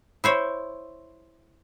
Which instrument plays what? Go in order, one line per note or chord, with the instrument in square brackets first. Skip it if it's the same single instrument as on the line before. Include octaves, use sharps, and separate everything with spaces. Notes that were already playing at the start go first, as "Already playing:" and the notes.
[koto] E4 C5 C#5